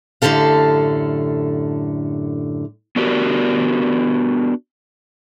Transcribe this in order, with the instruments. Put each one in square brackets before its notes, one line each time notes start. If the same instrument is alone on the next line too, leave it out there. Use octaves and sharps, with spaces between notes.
[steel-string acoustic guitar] F#2 A2 D3 G4 A4 F5
[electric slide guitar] B3 D4 F#4 G4 A#4